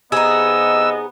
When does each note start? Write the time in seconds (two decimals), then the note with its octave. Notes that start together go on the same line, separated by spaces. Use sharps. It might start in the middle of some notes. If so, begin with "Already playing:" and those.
0.12 C3 B3 D#4 G#4 D#5 E6